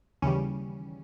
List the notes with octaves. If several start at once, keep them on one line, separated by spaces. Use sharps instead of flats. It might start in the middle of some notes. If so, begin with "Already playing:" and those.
D#2 C#3 E3 G3 C#4